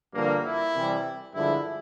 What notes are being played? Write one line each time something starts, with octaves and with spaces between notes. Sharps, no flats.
G2 D3 F3 A#3
E4
C2 C3 E3 G3
G2 D3 F3 G#3 E4